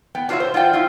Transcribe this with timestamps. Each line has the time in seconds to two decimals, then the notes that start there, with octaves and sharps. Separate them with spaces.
0.15 B3 G5
0.29 D4 F4 F#4 A#4 C#5 E5
0.40 C5
0.54 F4 D5 F#5 G5
0.73 C#4 E4 F4